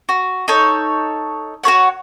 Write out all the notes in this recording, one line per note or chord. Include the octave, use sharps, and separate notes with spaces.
F#4
D#4 A4 C#5
F#4 A4 C#5 F#5